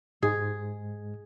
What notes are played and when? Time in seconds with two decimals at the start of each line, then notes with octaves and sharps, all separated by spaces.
0.23 G#2 G#3 G#4